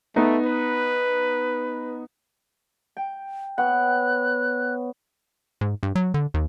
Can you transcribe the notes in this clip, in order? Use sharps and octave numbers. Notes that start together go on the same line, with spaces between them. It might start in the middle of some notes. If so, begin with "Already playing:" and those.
A3 B3 D#4
B4
G5
B3 C#5 F#5 G5 F#6
G#2
G2
F#3
D3
D#2